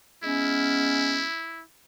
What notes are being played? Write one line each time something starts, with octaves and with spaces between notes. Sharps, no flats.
G#3 B3 C#4 E4